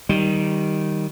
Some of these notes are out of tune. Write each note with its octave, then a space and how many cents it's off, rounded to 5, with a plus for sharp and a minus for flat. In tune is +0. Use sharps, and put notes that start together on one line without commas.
D#3 +0 G3 -15